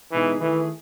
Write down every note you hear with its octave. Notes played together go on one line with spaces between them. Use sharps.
B2 E3 G#3 D#4 G#4
D#3 E3 A3 E4 G#4